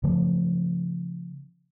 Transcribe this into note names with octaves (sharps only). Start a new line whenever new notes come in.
C#3 F3 A3